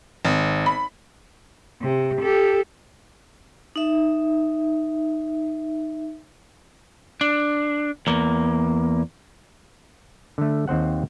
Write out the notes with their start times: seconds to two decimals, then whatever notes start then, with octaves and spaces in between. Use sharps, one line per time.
0.25 G#1
0.66 B5
1.82 C3
2.22 G4 A4
3.76 D#4 E5
7.21 D4
8.07 E2 A#3
10.38 D3 A3
10.68 D#2 C4 C5 F#5